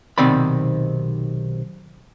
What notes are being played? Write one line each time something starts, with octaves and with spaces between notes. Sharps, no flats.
B1 C3 D#3 C4 D5 B5